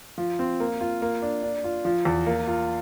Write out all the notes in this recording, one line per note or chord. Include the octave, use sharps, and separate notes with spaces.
F3
C4
A#3
F4
A#3
D4
D4
F4
F3
E2
A#3
F4